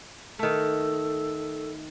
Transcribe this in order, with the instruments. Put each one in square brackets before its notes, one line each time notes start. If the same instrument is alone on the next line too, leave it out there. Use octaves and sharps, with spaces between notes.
[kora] D#3 A3 [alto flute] A4